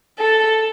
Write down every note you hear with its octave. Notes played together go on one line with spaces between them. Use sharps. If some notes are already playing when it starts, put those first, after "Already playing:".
A4